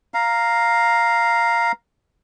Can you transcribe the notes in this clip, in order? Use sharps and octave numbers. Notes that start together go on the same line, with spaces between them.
F5 A#5